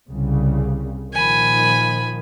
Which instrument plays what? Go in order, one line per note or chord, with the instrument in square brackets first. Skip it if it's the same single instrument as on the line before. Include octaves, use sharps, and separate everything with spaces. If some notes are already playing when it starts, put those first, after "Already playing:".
[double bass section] C2 C#3
[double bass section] A#2 D#3 F3 [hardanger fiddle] G#5 B5